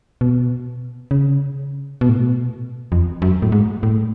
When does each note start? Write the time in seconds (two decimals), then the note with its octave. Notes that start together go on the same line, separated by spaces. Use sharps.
0.21 B2
1.11 C#3
2.01 B2
2.09 A2
2.17 B2
2.92 F2
3.22 F#2
3.42 A2
3.52 G#2
3.83 A2